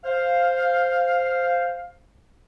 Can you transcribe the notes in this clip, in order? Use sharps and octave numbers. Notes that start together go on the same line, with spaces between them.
C5 F5